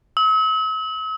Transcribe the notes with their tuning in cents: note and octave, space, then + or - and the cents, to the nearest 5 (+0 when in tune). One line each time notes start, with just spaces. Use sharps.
E6 -45